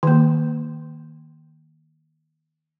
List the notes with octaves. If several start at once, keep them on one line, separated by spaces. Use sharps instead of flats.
D#3 A#3